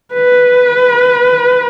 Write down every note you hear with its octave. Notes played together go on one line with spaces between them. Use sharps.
B4